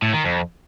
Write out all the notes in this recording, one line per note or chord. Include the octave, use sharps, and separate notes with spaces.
A2
D#3
F2